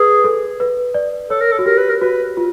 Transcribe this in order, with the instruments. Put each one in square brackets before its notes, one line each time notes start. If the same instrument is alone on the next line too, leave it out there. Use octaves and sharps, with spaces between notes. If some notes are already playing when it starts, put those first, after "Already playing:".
Already playing: [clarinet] G#4 [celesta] B4
[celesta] A4
B4
D5
[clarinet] A4 [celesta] C#5
[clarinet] A#4
A4
[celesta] F#4
[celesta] G4 [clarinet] A#4
[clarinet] B4
A#4
[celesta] F#4 [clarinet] B4
[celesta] F4